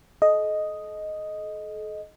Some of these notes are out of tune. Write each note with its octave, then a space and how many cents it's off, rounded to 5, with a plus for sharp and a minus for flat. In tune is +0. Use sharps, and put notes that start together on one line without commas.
A4 -40 D#5 +0